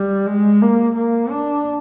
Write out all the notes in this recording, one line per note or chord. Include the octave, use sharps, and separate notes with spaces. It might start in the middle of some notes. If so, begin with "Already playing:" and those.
Already playing: G3
G#3
A#3
A#3
D4